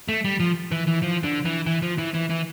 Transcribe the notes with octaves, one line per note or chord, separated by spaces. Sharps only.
A3
G3
F3
E3
E3
F3
D3
E3
E3
F3
E3
E3
E3